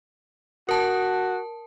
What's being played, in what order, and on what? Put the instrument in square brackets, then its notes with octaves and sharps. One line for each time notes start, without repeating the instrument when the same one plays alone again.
[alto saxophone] F#4 [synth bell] A#4 A5